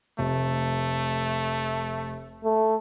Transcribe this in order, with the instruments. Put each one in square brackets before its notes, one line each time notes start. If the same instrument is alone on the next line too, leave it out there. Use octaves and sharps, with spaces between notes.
[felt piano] F1 [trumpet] A3
[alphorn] A3